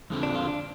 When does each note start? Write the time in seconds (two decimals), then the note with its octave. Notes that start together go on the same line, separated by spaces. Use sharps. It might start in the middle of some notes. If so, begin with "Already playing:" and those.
0.10 F2 D3 F3 C4
0.23 D4
0.35 F4
0.48 D4